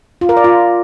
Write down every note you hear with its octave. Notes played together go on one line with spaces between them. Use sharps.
F4
A#4
D5
F4